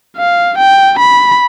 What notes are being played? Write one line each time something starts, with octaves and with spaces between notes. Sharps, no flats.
F5
G5
B5